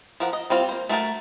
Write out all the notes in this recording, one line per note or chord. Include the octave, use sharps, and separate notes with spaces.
F3 A#4 F#5
D#5
G3 C4 F4
A#3 C5
A3 D4 F#4 A#4 A5